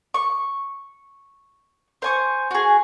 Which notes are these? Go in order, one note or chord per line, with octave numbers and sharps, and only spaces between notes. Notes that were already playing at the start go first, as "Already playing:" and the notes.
C#6
C5 G#5 C#6
F#4 G#4